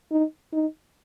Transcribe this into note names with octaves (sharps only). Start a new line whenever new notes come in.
D#4
D#4